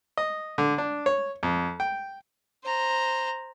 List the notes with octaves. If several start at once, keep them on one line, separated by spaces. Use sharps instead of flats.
D#5
D3
D4
C#5
F2
G5
C5 A#5